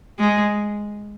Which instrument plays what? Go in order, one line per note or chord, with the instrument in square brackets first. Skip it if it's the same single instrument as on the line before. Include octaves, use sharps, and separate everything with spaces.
[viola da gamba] G#3